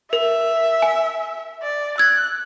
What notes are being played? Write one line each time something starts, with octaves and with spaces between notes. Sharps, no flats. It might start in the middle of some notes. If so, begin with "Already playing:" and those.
A#4 E5
G#5
D5
E6 F#6 G#6